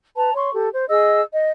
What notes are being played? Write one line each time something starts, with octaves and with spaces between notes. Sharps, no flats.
B4 A5 A#5
C#5 C6 C#6
G4 A4
C5
G#4 D#5 E6
D#5